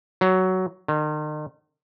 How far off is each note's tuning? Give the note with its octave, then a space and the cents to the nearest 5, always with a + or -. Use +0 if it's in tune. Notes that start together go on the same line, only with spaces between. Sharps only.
F#3 +10
D#3 -40